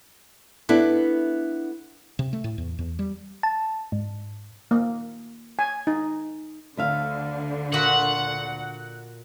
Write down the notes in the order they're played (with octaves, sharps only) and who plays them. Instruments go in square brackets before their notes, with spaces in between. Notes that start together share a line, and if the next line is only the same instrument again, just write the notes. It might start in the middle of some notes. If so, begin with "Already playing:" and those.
[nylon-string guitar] B3 D4 E4 A4
[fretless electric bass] C3
A3
A2
E2
E2
G3
[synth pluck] A5
G#2
[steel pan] A#3
G#5
D#4
[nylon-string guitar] D2 E5 F5 [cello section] D3
[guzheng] A#2 F#4 B5 [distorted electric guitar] F#5